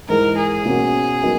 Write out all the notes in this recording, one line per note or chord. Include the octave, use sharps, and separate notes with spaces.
G#2 E3 G#3 A#4
G#4
B2 A#3 C#4 F#4
F#3 B3 D#4 A#4